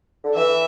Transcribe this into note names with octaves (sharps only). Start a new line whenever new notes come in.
D3
E3 E5